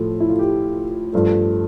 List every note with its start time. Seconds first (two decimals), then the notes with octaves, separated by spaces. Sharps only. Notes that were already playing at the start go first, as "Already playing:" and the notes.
Already playing: A2 F3 A3 A4
0.20 E4
0.29 F4
0.39 G4
1.13 G2 F3 A3